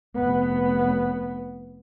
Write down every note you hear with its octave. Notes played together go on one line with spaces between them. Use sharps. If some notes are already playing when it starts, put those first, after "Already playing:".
F1 B3